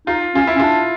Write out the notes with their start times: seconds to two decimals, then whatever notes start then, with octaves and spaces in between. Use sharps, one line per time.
0.07 D#4 F4
0.35 C#4 F4
0.47 E4
0.56 C#4
0.59 D4 F4